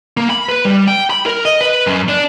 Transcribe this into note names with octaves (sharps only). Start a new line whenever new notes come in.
A#3
B5
B4
G3
G5
B5
A#4
D#5
B4
F#2
D4